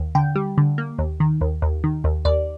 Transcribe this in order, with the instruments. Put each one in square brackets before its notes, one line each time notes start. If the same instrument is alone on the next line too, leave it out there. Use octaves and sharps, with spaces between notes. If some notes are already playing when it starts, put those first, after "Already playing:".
Already playing: [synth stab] D#2
D3 G5
G3
D3
A#3
D#2
D#3
D#2
D#2
D#3
D#2
D#2 D5